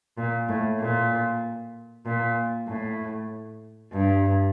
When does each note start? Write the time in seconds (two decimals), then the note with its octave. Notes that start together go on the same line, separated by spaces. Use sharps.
0.18 A#2
0.49 A2
0.80 A#2
2.05 A#2
2.67 A2
3.92 G2